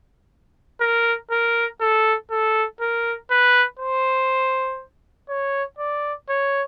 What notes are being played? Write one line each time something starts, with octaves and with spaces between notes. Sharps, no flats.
A#4
A#4
A4
A4
A#4
B4
C5
C#5
D5
C#5